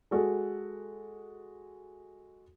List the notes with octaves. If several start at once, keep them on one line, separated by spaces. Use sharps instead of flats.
G#3 F#4 A4